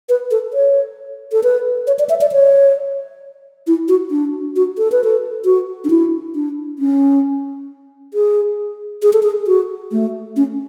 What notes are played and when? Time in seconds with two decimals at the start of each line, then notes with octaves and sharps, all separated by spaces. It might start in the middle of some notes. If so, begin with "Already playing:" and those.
0.09 B4
0.31 A4
0.53 C#5
1.32 A4
1.43 B4
1.87 C#5
1.99 D5
2.09 E5
2.21 D5
2.32 C#5
3.67 E4
3.88 F#4
4.11 D4
4.56 F#4
4.78 A4
4.92 B4
5.04 A4
5.45 F#4
5.84 D4
5.90 E4
6.35 D4
6.79 C#4
8.14 G#4
9.03 G#4
9.13 A4
9.23 G#4
9.47 F#4
9.92 A3
10.36 C#4